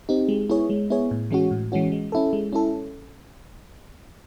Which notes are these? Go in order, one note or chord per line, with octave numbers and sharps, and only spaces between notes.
C4 D#4 G4
G#3
B3 E4 G#4 C#5
G#3
B3 E4 G#4 C#5
A2
E3 G#3 C#4 F#4
A2
E3 G#3 C#4 F#4
G#3
C#4 E4 A4
G#3
C#4 E4 A4